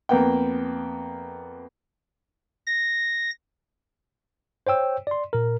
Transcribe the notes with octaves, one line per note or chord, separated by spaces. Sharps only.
F2 A#3 B3 G5
A#6
C5 C#5 G5 E6
D5 C6
A#2 A#4